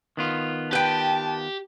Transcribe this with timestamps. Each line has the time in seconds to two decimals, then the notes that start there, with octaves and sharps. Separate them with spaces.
0.17 D#3 B3 F4
0.73 G4 B4 G5 A5